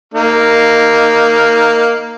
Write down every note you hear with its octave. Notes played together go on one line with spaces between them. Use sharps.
A#3 D#4